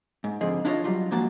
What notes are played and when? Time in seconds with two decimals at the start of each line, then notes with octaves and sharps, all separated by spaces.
0.24 G#2
0.41 F2 D3 F3 G#4 D#5
0.65 D4 E4 F4 C5 C#5 D#5
0.84 F#3 G3 F4
1.11 G#2 F3 A#3 F#4 A5